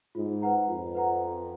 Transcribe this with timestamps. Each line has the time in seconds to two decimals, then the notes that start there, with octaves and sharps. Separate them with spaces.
0.15 G#2 F4
0.42 B4 F#5 A#5
0.68 F2 F4
0.95 B4 F#5 A#5